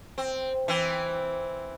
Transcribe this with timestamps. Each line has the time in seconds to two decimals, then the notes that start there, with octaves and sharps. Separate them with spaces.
0.18 C4
0.68 E3 C4